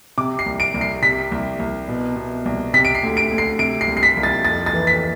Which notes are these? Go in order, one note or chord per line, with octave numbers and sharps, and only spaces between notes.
C3 D6
C7
C2
D7
C2
C7
C3 B6
C2
C2
B2
B2
C2
C3 B6
D7
C7
D2
D7
D2
C7
C3 D7
C7
C2
C7
B6
C2
A6
F2 A6
A6
E3
B6